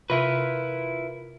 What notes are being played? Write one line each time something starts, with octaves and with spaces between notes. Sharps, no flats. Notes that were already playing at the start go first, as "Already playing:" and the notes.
C3 E4 F4 A#4 B4 E5